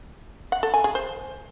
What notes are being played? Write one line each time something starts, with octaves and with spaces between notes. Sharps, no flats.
F#5
A4
G#5
G#4
C5